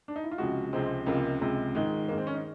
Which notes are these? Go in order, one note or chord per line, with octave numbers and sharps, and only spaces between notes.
D4
D#4
E4
F4
C#2 C3 F3 G#3 F#4
C#2 C3 F3 G#3 C4
C#2 C3 F3 G#3 A#3
C#2 C3 F3 G#3
G#2 D#3 G#3
G#2 D#3 G#3 A#3
C4
C#4
D#4